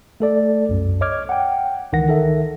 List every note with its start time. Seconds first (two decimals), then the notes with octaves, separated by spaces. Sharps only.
0.20 A3 A4 D5
0.69 C2 F#2
1.01 C#5 D#5 D6 F6 G#6
1.29 F#5 G5
1.93 C#2 D#3 E3 F#5 A#6
2.09 D#3 A4 E5